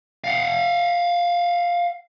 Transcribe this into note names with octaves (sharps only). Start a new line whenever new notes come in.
F5 F#5